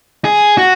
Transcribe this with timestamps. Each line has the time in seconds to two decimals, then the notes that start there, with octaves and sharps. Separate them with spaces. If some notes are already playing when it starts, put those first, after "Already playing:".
0.25 G#4
0.58 F#4